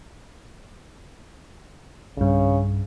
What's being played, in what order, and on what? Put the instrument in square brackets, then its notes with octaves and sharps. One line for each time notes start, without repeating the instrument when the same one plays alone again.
[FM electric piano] B1 G2 [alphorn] C#3